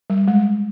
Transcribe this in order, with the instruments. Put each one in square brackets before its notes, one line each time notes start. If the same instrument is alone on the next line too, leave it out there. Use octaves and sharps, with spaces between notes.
[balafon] G3
G#3